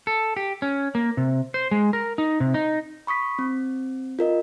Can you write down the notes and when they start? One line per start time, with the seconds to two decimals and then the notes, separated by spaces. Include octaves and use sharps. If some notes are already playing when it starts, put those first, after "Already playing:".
0.07 A4
0.37 G4
0.62 C#4
0.95 A#3
1.17 C3
1.54 C5
1.71 G#3
1.93 A#4
2.18 D#4
2.40 C3
2.54 D#4
3.07 B5 C#6 D#6 B6
3.39 C4
4.19 F4 A#4 D#5